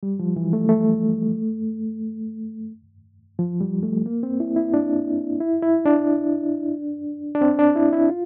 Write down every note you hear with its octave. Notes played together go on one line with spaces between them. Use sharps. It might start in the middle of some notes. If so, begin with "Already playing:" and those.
G3
F3
E3
A3
A3
F3
G3
A3
A#3
C4
E4
E4
D4
E4
E4
D4
D4
C4
D4
E4
E4
F4